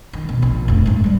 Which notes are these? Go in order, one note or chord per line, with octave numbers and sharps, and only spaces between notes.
D#3
B2
A#1
F1 D#2
G#2 D#4
G3 G#3